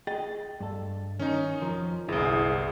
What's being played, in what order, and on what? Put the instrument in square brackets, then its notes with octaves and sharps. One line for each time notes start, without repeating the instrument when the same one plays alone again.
[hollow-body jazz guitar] G#4 D#5 G5 [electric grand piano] A6
[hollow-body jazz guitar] G2 A4
[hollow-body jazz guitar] D#3 [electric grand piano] C#4 D#4
[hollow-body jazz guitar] F2 F3 A#4
[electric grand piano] G1 C2 [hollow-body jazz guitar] E4 [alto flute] G#4